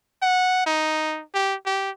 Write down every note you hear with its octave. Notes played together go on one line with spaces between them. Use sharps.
F#5
D#4
G4
G4